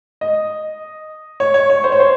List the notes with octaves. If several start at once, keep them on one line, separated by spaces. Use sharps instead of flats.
D#5
C#5
C#5
C#5
C5
C#5
C5